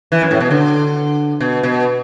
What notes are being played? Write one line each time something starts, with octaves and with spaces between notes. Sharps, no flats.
E3
F#2
A2
B2
D3
B2
B2